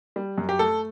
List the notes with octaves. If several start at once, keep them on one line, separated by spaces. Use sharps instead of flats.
G3
F#2
G4
A3 A4